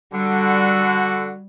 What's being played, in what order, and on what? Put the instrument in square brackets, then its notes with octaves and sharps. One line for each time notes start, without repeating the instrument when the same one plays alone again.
[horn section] D3 [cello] G3 [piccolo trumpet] F#4